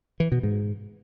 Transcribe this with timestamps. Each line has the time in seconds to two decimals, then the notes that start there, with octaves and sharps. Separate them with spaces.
0.20 E3
0.32 B2
0.43 G#2